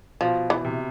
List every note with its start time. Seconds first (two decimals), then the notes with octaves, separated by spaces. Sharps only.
0.21 B2 F3
0.50 E3
0.65 C3